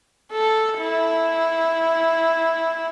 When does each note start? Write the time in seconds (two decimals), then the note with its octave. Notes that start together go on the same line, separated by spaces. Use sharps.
0.33 A4
0.79 E4